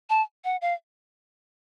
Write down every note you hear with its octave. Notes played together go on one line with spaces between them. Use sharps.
A5
F#5
F5